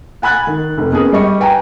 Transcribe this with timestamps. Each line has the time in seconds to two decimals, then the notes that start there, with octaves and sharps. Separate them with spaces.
0.22 F#5 G#5 B5 F#6 G#6 A6
0.47 D#3
0.78 F1
0.92 B3 C#4 G#4 A#4
1.12 G3 D#5 C#6
1.40 B4 G5 G#5 A#5